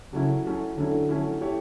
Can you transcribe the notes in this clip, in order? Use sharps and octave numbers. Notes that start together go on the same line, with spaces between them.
C#3 F#3 A3 C#4 E4
F#3 A3 C#4 E4
D3 F#3 A3 C#4 E4
F#3 A3 C#4 E4
A3 E4 G4 C#5